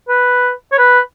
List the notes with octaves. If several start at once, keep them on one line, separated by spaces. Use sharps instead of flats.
B4
C#5
B4